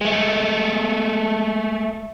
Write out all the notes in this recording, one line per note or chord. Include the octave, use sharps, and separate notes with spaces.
G#3 A3